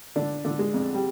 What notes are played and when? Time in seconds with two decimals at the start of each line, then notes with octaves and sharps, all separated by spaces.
0.16 D3 D4
0.45 D3
0.59 G#3
0.74 F2
0.94 G3